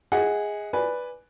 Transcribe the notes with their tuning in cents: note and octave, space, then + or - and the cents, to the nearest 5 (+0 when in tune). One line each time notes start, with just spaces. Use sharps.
G#4 -10 D#5 +30 F#5 +0
B4 +0 D5 +0 G#5 +0